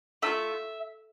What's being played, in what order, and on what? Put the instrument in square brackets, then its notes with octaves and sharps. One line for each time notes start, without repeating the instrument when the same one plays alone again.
[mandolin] A3 D4 F4 E5